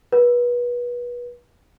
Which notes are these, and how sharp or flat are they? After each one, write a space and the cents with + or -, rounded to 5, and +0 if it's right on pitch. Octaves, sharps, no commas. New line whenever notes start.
B4 -30